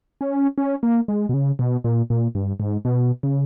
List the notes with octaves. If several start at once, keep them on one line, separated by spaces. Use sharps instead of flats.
C#4
C#4
A#3
G#3
B2
C#3
B2
A#2
A#2
G2
G#2
B2
C#3